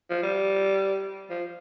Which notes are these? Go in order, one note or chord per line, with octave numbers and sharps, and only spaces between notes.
F3
G3
F3